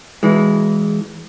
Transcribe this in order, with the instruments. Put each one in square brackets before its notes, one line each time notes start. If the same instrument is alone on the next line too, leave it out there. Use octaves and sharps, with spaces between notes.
[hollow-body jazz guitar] E3 G#3